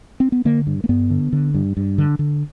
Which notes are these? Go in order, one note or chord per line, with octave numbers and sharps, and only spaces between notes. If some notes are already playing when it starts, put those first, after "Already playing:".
C4
B3
D3 A#3
G2
A#3
G2 B3
D3
D3
G2
G2
D3
D3